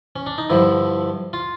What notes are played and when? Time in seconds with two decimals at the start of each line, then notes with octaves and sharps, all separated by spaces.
0.16 C#4
0.26 D4
0.38 D#4
0.50 G2 D3 F3 E4
1.33 F4